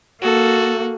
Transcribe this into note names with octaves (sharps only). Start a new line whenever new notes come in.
A#3 F#4 A4